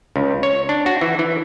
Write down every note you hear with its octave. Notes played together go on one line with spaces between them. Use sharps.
C#2
C#5
D4
F#4
E3
E3